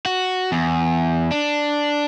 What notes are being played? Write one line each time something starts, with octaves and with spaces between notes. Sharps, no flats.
F#4
E2
D4